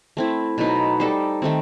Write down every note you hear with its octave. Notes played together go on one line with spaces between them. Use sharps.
A3 C4 E4
B2 F#3 B3 D#4
G3 D#4 A4 C5
D#3 A3 C4